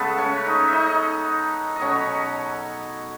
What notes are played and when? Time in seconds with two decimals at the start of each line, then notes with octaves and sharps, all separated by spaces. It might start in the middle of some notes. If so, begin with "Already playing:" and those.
Already playing: C#3 G#3 A3 B3 A4 B4
0.18 C#4 C#5
0.46 D#4 D#5
0.68 D#4 D#5 E5
1.76 D#5
1.81 B2 F#3 A3 C#4 C#5